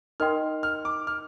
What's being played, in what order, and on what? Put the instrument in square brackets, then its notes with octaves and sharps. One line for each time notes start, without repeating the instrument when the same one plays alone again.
[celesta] D#4 A#4 D#5 G5 C6 [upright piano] F6
[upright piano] F6
D6
F6